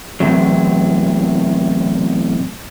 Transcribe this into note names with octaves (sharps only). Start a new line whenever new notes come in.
E2 A2 C3 F#3